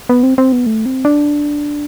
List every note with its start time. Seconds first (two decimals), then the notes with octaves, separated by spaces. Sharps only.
0.09 B3
0.23 C4
0.38 C4
0.52 B3
0.66 A3
0.86 C4
1.05 D4